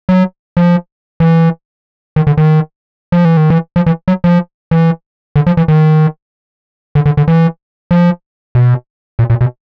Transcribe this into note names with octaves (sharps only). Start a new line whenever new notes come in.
F#3
F3
E3
D#3
D3
D#3
F3
E3
D#3
E3
F3
E3
F#3
F3
E3
D3
F3
E3
D#3
D3
D3
D3
E3
F3
B2
A#2
A#2
B2